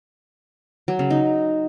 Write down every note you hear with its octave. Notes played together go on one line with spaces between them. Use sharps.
F#3
C#3
D#4